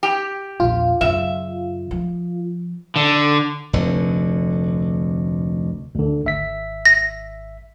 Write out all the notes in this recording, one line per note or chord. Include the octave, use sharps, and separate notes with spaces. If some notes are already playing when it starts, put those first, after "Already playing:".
G4
A#1 E2 F4
F#2 C#3 E5
F3
D3
F1 D2 D3
D2 D3
G#1 E5 B6
A#6